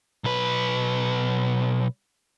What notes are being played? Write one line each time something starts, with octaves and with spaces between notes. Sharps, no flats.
B1 B4